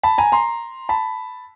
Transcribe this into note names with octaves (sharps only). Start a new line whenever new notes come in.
A5 B5
G#5 A#5
A#5 C6
A5 B5